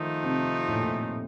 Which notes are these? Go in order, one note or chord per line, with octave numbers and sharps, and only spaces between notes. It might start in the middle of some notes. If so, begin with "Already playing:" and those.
Already playing: D#3 F3 A3 D#4
C3
A2
A#2
A2